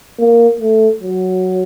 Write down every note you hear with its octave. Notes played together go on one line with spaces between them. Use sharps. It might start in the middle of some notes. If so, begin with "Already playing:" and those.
A#3
A3
F#3